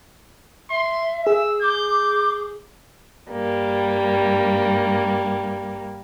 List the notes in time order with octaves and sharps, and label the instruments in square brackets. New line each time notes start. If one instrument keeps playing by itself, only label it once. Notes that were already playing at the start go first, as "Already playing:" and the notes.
[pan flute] E5 [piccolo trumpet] C6
[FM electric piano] G#4 [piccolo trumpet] E6
[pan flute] D6 [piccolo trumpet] G6
[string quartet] G2 G3 A#3